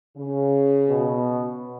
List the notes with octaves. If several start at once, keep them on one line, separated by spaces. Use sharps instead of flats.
C#3
B2